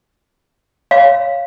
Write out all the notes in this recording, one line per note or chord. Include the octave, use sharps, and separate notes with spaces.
C#5 F5